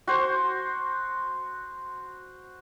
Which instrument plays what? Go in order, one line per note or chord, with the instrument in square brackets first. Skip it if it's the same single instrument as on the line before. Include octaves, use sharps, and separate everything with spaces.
[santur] F#4 C5